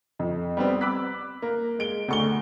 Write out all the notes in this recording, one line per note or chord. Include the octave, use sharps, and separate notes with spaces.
F2
G3 B3 C4
B5 D6 E6 F#6 B6
A#3
G#3 D7 G7
D2 C#6 G7